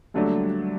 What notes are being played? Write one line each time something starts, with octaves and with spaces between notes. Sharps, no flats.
D#2 D3 F#3 G3 A3 D4